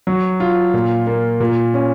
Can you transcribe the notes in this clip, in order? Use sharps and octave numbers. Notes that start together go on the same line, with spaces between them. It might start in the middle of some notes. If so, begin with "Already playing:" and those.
F#3
F4
A#2
A#3
A#2
C#4